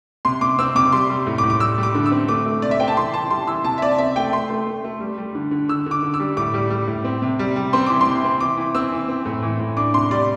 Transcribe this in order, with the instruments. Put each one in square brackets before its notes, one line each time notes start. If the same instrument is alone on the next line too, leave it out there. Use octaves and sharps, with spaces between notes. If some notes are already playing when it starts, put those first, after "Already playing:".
[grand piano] C3 C6
C3 D6
C4 E6
C3 D6
G3 C6
G3
A2
D6
A2
D6
G3 E6
G3
D6
D3
E6
C4
A3 D6
A3
C3 D5
E5
C4 G5
A5
E3 C6
E3 A5
G3 C6
E3 E6
C3 A5
E5
C4 D5
C4 E5
A3 G5
A3 C6
A3
A3
A3
G3
G3
D3
D3
D3 E6
D3 D6
D3
E6
G3
A2 D6
G3
G3
A2
C4
C3
G3
G3
C4 C6
E3 D6
C6
C3
C4
E3 D6
E3
C4 E6
E3
C4
A2
E3
A2
D4 D6
C3 C6
G3 D5